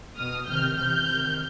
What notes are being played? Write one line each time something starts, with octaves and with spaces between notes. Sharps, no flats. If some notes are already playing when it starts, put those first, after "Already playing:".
B2 D#6 F6
C3 D#3 F6 G6
C3 E3 F6 G6
C3 D#3